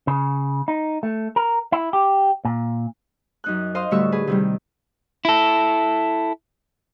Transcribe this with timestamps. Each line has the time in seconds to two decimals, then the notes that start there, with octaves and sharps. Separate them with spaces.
0.07 C#3
0.68 D#4
1.03 A3
1.36 A#4
1.72 E4
1.93 G4
2.45 A#2
3.44 F#2 D#4 F#6
3.75 C5 D#5 F5 C6
3.91 A2 D3 G3 F#4 C#6 E6
4.12 G#4 B4
4.27 C3 D#3 G3
5.25 E4 A4